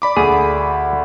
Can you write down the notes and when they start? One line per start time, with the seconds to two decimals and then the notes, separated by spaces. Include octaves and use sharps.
0.02 D5 B5 D6
0.16 D2 G#4